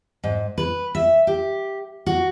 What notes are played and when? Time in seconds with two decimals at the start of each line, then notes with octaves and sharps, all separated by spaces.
0.24 G#2
0.58 B4
0.95 E5
1.27 G4
2.06 F#4